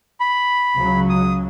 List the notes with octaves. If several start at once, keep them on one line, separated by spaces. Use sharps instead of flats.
B5
C#2 C#3 F#3
D#6